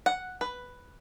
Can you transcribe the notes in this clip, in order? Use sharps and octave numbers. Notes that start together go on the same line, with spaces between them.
F#5
B4